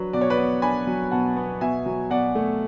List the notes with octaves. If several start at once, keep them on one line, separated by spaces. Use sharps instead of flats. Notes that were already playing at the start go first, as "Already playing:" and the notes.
Already playing: F#3 D4 B4
B2 D5
C#5
B4 D5
B3
D4 G#5 B5
F#3
B2 F#5 A5
B3
B2 E5 G#5
F#3
B2 D5 F#5
A3